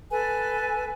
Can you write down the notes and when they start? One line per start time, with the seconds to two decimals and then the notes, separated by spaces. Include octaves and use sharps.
0.11 A4 B4 G#5